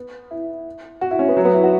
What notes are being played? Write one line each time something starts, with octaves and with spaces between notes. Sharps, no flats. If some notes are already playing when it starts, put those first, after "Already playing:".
Already playing: B3
E4
F#4
E4
C#4
B3
F#3
B3
E4
F#4